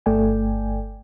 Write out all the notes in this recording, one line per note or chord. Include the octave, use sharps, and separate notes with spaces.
G1 A3 A4 D5 G5 G#5